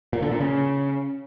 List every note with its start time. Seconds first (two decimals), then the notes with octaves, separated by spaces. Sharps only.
0.13 A#2
0.22 D3
0.31 A#2
0.41 C#3